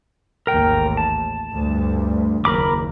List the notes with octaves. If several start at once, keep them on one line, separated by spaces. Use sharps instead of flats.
A1 D#2 G#2 A#4 G5
A5
D2 G2
F#1 D#2 A#4 B5 D6